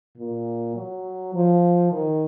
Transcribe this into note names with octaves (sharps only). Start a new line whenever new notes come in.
A#2
F#3
F3
D#3